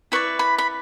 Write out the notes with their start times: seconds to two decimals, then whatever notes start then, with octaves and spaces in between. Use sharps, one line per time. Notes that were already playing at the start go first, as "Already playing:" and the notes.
0.12 E4 B4 D5 C#6
0.39 B5
0.58 B5